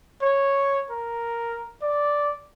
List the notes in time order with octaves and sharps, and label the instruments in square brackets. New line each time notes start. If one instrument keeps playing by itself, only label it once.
[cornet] C#5
A#4
D5